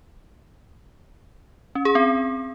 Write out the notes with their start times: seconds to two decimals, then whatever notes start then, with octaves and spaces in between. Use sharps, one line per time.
1.75 C#4
1.85 G#4
1.95 C4